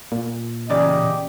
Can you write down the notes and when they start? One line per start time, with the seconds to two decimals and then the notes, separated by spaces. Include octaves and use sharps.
0.12 A#2
0.70 E2 C#3 G4 D5 D#5